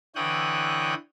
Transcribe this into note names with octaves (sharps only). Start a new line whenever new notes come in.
D3 E3 C#5 G5 D#6 F#6